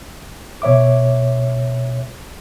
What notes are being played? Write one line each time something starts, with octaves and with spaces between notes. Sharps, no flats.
B2 C#5 E5 D6